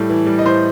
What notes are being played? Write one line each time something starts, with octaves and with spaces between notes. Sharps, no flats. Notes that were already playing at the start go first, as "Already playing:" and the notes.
Already playing: A2 G3 A4
E3
G3
D#5
A2 C5